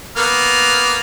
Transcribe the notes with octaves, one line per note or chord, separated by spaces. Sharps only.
A#3 B3 F6